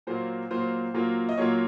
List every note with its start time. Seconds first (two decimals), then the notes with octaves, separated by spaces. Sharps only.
0.07 A#2 F#3 A#3 F4 C5
0.50 A#2 F#3 A#3 F4 C5
0.94 A#2 F#3 A#3 F4
1.29 D#5
1.38 A#2 F#3 A#3 F4 C#5